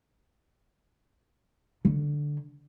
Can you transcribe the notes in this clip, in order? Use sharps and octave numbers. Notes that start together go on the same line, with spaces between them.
D3